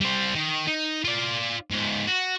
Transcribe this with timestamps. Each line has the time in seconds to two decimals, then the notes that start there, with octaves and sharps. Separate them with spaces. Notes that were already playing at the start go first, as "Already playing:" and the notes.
0.01 G3 C5
0.35 D#3
0.67 D#4
1.05 F4 D5
1.71 G#2 F4
2.07 F#4